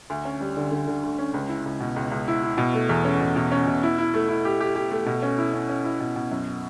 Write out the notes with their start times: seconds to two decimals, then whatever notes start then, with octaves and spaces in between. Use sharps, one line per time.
0.10 D2
0.25 C#4
0.41 G3
0.57 D3
0.72 D3
0.88 D3
1.03 D2
1.18 C#4
1.34 C#2
1.49 E4
1.66 C#2
1.80 B2
1.96 C#2
2.12 C#2
2.28 E4
2.43 E4
2.58 B2
2.74 A3
2.89 E2
3.05 C#4
3.21 B2
3.36 B2
3.52 C#4
3.67 B2
3.83 E4
3.98 E4
4.14 A3
4.29 E4
4.45 G4
4.60 G4
4.76 G4
4.91 A3
5.06 B2
5.22 C#4
5.38 E4
5.54 C#4
5.69 C#4
5.84 E4
6.00 B2
6.16 B2
6.32 F#2